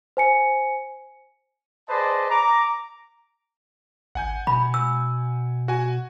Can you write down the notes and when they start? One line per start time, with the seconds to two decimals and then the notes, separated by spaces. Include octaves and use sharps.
0.17 C5 G#5 C#7
1.89 G#4 B4 C5 D5 D#5 A5
2.30 A#5 D6
4.15 G#1 F#5 G#5 G6
4.47 B2 B5
4.74 E6
5.68 F#4 G#5